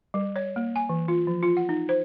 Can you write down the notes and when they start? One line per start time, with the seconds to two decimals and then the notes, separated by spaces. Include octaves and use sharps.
0.14 G3
0.36 C#5
0.56 A#3
0.76 G#5
0.89 E3
1.08 F4
1.27 F3
1.43 F4
1.57 F#5
1.69 D#4
1.89 C5